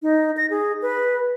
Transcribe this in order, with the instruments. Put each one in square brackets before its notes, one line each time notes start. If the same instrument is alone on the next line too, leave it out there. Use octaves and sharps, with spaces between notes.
[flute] D#4
A#6
G#4
B4